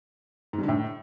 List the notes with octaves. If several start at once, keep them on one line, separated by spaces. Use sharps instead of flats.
G#2
G2
D3
A2